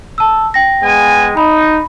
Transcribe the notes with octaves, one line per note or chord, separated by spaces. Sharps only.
A5 E6
G5 A#6
G#3 B3 G#5
D#4 B5